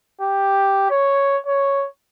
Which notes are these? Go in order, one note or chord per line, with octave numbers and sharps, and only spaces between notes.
G4
C#5
C#5